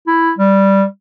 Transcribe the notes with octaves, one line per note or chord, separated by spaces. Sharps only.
E4
G3